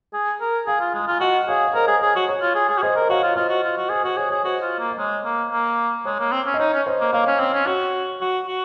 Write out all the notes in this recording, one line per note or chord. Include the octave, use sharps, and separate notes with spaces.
G#4
A#4
G#4 F5 G#5
F4
G#3
A#5
F4 G#5
F#4 D#5 F#5
F#5
G#4 C#5 F5
C#5
A#4 C5 D#5
G#4
G#4 C#5
F#4
C#5
F4
G#4
G#4
F#4
G#4 C5 D#5
A#4
F#4 C#5 F5
F4
F4 C5 D#5
F#4
F4
F#4
G#4 C5
F#4 C5
G#4 C#5
G#4 C#5
F#4 C5 D#5
F4
A#3
D#5
G#3 C#5
A#3
A#3
G#3 C#5
A#3
C4
C#4
D#5
D#4 C#5
C#4
C5 D#5
A#3
A#3 C#5 F5
C#4
C4 C#5
C#4
F#4 C#5
F#4
F#4